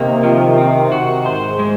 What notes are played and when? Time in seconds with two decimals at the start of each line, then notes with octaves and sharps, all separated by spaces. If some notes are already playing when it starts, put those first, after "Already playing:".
Already playing: C3 D#3 A#3
0.23 F3
0.58 C4
0.91 C3 D#3 F#4
1.25 G#2 C5
1.59 G#3